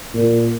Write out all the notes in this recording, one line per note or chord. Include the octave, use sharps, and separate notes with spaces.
A#2